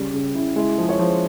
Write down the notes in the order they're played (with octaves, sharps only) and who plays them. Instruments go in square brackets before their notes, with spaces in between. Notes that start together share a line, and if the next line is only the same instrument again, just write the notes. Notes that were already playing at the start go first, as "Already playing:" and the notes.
Already playing: [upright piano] C#3 G3
C#3
[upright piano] C#3 [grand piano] E4
[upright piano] G#3 [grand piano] E4
[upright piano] F3 [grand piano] G#4
[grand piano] C#5
[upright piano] F3 [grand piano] C5